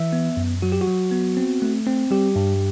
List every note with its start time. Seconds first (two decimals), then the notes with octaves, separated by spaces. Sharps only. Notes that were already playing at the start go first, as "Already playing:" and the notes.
Already playing: E3 E5
0.13 B3
0.37 F#2
0.62 F#3 F#4
0.72 G4
0.81 F#4
0.88 F#3
1.11 B3
1.37 C4
1.62 A3
1.87 C4
2.11 G3 G4
2.36 G2